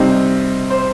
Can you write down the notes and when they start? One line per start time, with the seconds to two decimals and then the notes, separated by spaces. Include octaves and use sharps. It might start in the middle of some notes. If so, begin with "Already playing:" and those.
Already playing: C3 G3 C4 D#4
0.70 C5